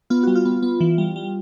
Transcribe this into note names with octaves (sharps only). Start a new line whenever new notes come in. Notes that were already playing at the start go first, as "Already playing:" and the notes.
B3 F4
G3 F#4
F4
B3
B3
E3
G3
G3